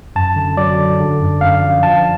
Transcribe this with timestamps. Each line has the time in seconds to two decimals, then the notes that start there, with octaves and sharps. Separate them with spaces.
0.16 F#2 A5
0.36 D3
0.57 F#3 D5
0.79 D3
1.00 D3
1.20 F#2
1.41 F#2 F5
1.63 F3
1.83 F3 A5